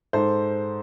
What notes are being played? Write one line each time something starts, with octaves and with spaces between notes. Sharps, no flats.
G#2 A4 C5